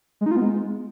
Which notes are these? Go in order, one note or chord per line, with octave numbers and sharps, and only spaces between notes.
G#3
D#4
F4
B3
G#3